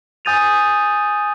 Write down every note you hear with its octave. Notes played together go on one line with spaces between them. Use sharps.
G#5 D#6 G6 A6 D#7 F7